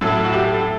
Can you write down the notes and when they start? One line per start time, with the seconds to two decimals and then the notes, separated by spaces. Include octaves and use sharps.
0.01 A2 F#3 A3 A4
0.24 F#4
0.33 G4
0.44 A4
0.54 A4